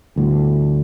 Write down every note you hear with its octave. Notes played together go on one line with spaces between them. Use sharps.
G1 D2 A2